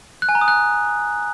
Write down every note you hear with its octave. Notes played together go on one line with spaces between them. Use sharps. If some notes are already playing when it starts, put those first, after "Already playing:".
F#6
G#5
A#5
D#6
F#6